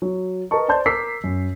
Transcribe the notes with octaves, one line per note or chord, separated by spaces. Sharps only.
F#3
A#4 B4 D#5 A5 C#6
C5 D5 A5 C6 G6
A#4 D6 E6 B6 C7
F#2